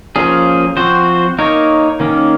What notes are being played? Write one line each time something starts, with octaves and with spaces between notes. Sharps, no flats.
F3 A#3 C#4 G#4
F3 C4 F#4 C5
A#3 D#4 A#4 C#5
D#3 A#3 C#4